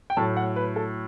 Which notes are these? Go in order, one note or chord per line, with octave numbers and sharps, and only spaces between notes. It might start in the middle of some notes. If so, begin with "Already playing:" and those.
G5
A2 F#3 A3 A5
F#5
B4
A4